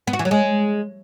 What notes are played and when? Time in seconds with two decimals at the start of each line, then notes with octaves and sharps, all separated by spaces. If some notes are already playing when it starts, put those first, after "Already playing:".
0.07 B3
0.13 F#4
0.19 E3
0.25 F#3
0.31 G#3